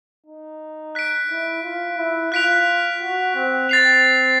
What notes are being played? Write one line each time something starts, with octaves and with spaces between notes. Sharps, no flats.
D#4
F#6 B6 D7
E4
F4
E4
F4 F#6 B6 D7 F7
F#4
C4
C4 A6 C7 F7